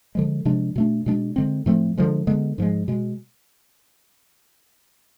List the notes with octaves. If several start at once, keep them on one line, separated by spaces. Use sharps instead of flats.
D3 F3 G#3
C3 F3 G#3 D4
B2 A3 D4
B2 G#3 D4
D3 G#3 C4
A2 F3 A3 C4
D3 F3 G#3
D3 G#3 B3
G#2 F3 G#3
B2 G#3